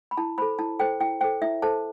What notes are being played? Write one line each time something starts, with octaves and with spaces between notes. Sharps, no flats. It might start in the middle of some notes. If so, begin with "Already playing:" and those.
B5
E4 A5
A4 C5 B5
E4 A5
A4 C5 G5
E4 G5
A4 C5 G5
E4 E5
A4 C5 A5